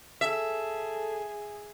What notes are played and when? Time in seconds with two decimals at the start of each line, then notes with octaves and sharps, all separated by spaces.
0.21 G#4 A4 E5